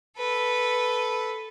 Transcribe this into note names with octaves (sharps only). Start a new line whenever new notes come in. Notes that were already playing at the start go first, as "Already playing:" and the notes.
A4 B4